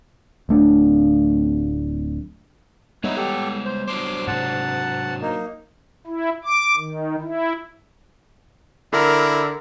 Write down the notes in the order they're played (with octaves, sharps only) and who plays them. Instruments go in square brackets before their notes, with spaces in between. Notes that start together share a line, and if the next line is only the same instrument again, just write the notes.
[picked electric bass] D1 A3 D4
[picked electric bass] G3 B3 [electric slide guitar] G#3 C#5 F#5 [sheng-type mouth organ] D#4 E5
[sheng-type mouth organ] G4 A4
C5
[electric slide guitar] F#3 D4 C5 [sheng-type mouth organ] C6 D6
[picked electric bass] G#2 C3 [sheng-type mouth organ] F#5 A5
[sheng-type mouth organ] A#3 D#4
[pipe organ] E4
D6
D#3
E4
[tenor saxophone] D3 [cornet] E4 [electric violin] A#4